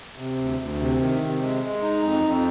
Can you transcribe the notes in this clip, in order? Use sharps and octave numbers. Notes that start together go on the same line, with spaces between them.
C3
D2
D2
C3
D#3
C3
G#3
G#3
D#4
F2
F2